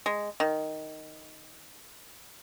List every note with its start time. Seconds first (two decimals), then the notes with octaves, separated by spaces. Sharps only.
0.06 G#3
0.40 D#3